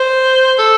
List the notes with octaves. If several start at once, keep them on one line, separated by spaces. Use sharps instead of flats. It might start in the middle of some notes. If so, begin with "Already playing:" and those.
Already playing: C5
A4